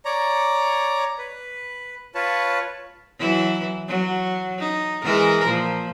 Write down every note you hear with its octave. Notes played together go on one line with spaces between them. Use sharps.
C#5 D5 A#5
B4
F4 B4 C#5 A5
E3 F#3 E4
F#3
D#4
E3 G#3 A#4
A#2 F3